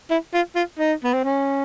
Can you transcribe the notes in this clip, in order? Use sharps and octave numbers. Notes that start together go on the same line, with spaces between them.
E4
F4
F4
D#4
B3
C4
C#4